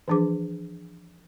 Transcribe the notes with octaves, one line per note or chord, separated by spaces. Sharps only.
E3 F3 D4 G#4 D6